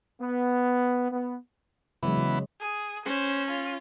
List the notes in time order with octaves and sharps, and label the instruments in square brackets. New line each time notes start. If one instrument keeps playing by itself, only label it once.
[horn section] B3
B3
[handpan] C#3 F#3 G#3 [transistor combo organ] E3 B3
[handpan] C#3
[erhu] G#4
[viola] C#4 [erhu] C5
[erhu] F4